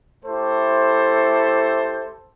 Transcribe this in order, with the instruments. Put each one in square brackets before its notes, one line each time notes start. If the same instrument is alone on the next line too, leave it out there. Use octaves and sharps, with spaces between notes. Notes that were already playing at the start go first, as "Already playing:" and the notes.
[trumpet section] A3 E4 G4 A4 C5